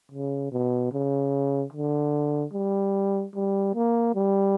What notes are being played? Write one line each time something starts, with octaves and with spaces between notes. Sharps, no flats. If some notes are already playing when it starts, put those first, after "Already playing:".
C#3
B2
C#3
D3
G3
G3
A#3
G3